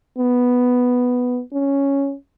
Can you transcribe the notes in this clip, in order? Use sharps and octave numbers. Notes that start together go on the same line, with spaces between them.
B3
C#4